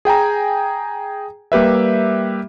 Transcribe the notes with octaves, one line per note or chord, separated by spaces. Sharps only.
G#4 G5 G#5 A#5
G3 A#3 G4 B4 E5